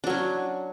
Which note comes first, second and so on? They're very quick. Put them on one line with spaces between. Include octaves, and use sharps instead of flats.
D4 F#3 C#4